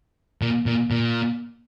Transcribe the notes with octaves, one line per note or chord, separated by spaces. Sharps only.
A#2
A#2
A#2